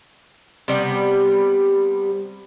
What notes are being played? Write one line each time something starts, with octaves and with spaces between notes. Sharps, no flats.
C3 G3 B3